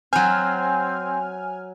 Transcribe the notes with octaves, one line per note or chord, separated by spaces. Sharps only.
F#3 C4 C5 G#5 F6